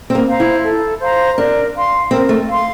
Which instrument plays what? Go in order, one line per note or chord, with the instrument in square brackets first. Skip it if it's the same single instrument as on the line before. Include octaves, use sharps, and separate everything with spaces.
[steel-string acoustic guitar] C4
A#3
[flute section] C5 F5 A#5
[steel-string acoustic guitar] E4
[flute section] A4
C5 F5 A#5
[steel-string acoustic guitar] D4 [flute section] A#4
[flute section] F5 C6
[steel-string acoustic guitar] C4 [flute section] A#4
[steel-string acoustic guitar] A3
[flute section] F5 C6